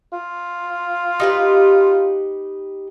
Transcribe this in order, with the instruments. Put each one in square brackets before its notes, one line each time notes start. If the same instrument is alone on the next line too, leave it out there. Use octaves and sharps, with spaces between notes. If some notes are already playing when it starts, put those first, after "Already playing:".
[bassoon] F4
[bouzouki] D#4 G4 B4